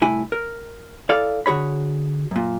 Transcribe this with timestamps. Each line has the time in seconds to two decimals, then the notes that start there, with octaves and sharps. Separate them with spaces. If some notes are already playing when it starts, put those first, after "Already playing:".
0.02 C2 A2 E4 G#5
0.32 A#4
1.09 E4 A4 D5 F5
1.46 D3 F#4 G#4 C#5 B5
2.31 F#2 A#2